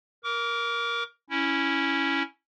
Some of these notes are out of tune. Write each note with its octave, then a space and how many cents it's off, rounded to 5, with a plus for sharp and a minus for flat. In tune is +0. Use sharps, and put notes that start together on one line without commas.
A#4 +10 D6 -35
C#4 +0 E4 +0